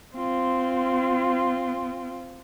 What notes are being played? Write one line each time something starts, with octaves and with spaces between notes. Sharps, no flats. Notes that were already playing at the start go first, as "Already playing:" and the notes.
C4 F4